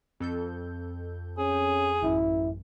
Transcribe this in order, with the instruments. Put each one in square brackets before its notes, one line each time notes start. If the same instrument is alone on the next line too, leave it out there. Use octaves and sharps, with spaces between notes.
[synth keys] F2 A4 G6
[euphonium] C#4 [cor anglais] G#4
[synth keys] A1 F#2 [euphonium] E4